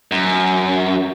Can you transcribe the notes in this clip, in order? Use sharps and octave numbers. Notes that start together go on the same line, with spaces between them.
F#2